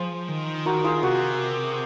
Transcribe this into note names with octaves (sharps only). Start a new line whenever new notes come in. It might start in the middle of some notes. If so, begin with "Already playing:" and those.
Already playing: F3 F4 G#4 C5
D#3
F#4 A#4
F4 G#4
C3 F#4 A#4